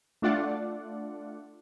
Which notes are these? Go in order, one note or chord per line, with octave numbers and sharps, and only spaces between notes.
A3 D4 F4 D5 F#5